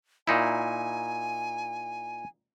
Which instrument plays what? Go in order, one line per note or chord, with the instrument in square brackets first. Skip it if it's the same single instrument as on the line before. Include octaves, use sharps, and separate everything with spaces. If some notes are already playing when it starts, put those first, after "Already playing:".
[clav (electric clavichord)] A#2 D#4 E4 [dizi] G#5